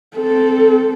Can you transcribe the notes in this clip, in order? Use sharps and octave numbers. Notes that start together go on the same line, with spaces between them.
C4 A4